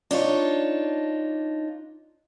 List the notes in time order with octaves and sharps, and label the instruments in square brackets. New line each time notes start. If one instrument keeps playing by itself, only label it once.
[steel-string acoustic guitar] D4 D#4 F4 C#5